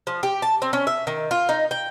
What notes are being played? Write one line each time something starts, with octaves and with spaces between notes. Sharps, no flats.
F3
G4
A5
C4
C#4
E5
D#3
F4
D#4
G5